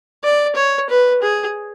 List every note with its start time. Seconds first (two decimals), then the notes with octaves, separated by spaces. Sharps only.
0.24 D5
0.56 C#5
0.89 B4
1.22 G#4